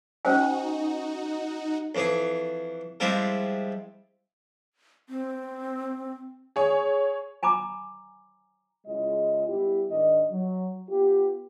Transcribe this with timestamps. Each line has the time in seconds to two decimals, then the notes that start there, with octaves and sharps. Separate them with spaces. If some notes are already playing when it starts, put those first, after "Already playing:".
0.25 C#4 D#4 F#4 C5 G#5
1.95 F2 E3 G#4
3.00 F3 G3 G#3 C4 E4 E5
5.09 C4
6.56 G#4 C#5
7.43 G#5 A#5 B5 D6
8.86 C#3 G#3 E4 F4 D#5
9.48 G3 B3 E4 G4
9.89 G#2 D#3 D4 D#5
10.31 F#3
10.90 B3 F4 G4